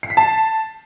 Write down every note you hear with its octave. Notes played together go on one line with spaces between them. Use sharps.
C7
B6
A5